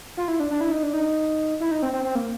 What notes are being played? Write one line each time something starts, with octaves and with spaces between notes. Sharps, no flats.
F4
E4
D4
D4
E4
D#4
D4
D#4
E4
D#4
C4
C4
C4
A#3